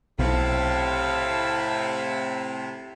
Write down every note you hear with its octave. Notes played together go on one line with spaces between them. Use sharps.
B1 A2 C3 E4 F5 A5